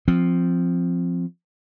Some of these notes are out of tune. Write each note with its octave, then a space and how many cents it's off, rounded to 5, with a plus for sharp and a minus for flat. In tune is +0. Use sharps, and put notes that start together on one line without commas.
F3 +0 C4 +0